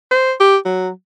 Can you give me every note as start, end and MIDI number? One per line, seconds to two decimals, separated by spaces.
0.11 0.33 72
0.40 0.57 67
0.65 0.90 54